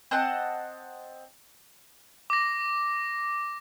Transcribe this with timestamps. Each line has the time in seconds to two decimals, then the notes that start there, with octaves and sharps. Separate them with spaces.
0.11 C4 D#5 F#5 A5
2.30 D6 A#6